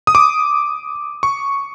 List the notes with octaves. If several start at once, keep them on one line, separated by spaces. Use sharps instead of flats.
D#6
D6
C#6